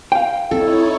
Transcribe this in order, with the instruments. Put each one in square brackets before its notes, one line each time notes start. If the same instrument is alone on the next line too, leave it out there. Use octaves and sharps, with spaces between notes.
[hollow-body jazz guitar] F5 G5
[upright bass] C4 [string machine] D#4 E4 C#5 [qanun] A4